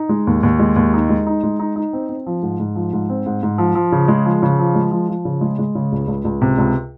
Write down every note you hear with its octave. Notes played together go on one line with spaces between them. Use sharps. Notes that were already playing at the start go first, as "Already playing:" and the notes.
Already playing: D#4
G#3
D#2
D#2
G#3
D#2
D#4
G#3
D#4
G#3
D#4
D#4
C4
C4
F3
G#2
G#2
F3
G#2
C4
G#2
G#2
F3
F3
C#3
G#3
F3
C#3
F3
G#3
F3
F3
C#3
G#3
G#3
C#3
C#2
C#2
C#2
C3
C#2